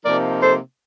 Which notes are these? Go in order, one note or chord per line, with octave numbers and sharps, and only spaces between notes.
C3 F3 A#3 D#4 A#4 D5
A4 C5